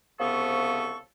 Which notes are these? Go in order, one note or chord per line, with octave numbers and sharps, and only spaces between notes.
C2 C#3 F3 B3 A4 C#6